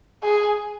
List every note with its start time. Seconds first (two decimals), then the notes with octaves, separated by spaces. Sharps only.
0.23 G#4